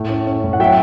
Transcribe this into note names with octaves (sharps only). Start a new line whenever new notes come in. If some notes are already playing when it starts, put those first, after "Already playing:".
Already playing: A2 A3
C#4
C#4
A2
F#5
F#3 E5 G5